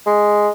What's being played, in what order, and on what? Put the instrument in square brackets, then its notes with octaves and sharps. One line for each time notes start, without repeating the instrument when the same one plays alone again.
[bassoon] G#3